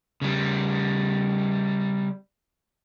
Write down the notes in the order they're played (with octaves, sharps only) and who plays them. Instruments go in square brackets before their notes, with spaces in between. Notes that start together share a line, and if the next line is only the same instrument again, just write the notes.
[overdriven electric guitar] C#3 G3